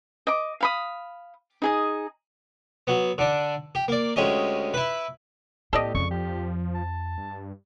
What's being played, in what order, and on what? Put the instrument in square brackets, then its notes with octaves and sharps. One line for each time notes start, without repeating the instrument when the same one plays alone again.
[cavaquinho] D#5 D6
F5 B5 D#6
D#4 G#4 D#5
[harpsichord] F#3 B3
D3 D4
G4
A#3 D5
D2 G#3 C#4 G4 D#5
E4 B4
[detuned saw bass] A2 [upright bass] B3 [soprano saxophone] G4 [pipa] A4 D5 D#5
[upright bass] F2 [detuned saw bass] C#3 [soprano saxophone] C#6
[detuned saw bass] F3 [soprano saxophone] G4
[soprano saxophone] A5
[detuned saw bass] G2